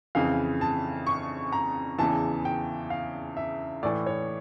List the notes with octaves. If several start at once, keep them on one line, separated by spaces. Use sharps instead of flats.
F2 C#3 E3 F5
A5
C#6
A#5
E2 C#3 E3 A5
G5
F5
E5
A2 E3 D5
C#5